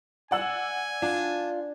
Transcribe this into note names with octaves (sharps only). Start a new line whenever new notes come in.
D5 F#5 G#5 E6
D4 F4